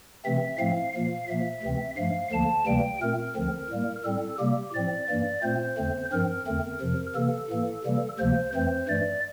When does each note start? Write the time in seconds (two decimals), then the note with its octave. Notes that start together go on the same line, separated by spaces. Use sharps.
0.25 C3 E3 A3 C4 E5
0.59 A2 F3 A3 C4 F5
0.93 A#2 F3 A#3 F5
1.28 A#2 F3 A#3 E5
1.63 D2 C3 E3 A3 C4
1.97 G2 F3 A3 F5
2.32 D2 D3 F3 A#3 A5
2.67 D2 C3 E3 G3 A#3 G5
3.02 A#2 A3 C4 A#4
3.35 D2 D3 F3 C4
3.70 A2 G3 A#3
4.04 A2 G3 C4 A4
4.39 C3 G3 A#3 G4
4.74 A2 F3 C4 D5
5.08 G2 E3 A#3 D5
5.43 A#2 A3 C4 C5
5.78 E2 D3 A3 C4
6.12 G2 F3 C4 A#4
6.47 E2 D3 A3 C4
6.81 F2 C3 F3
7.15 C3 E3 A#3 A4
7.50 A2 E3 A#3
7.84 C3 E3 G3 A#3
8.19 D2 C3 F3 A#3 C5
8.54 F2 E3 A3 C4 C5
8.89 G2 E3 A3 D5